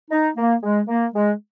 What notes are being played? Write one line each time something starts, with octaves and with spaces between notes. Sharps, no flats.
D#4
A#3
G#3
A#3
G#3